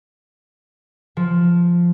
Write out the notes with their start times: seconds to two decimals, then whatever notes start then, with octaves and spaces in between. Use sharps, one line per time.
1.17 F3